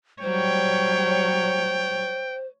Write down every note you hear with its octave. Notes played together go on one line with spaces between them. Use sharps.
F#3 G3 C5 C#5 G5